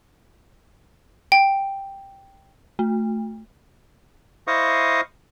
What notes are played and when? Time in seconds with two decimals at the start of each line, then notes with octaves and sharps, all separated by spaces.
1.32 G5
2.79 A3
4.47 E4 C5 D#5 F5 C#6 D#6